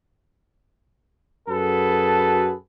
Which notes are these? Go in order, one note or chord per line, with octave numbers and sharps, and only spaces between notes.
F#2 F#4 G#4 A4 B4 A5